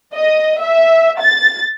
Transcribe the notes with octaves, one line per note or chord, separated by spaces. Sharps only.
D#5
E5
A6